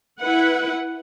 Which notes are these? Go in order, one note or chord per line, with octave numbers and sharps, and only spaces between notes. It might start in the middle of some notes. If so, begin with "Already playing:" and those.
E4 B4 F#5